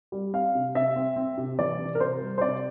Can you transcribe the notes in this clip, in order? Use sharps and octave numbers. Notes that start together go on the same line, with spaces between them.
G3
C4 F5
C3
C3 E5
C4
C4
C3
E3 D5
C3
A#4
C3 C5
G3
C5
C3 D5